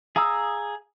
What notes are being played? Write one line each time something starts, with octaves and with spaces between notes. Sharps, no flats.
G#4 F5 A#5 D#6 E6